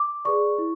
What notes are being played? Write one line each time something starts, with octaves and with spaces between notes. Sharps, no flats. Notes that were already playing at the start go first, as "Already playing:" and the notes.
Already playing: D6
G#4 B4 D5 C#6
E4